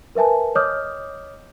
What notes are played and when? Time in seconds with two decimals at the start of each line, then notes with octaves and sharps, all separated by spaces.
0.15 A#4 B4 E5 G#5 A5
0.55 C#5 D#5 D6 D#6 F6 G6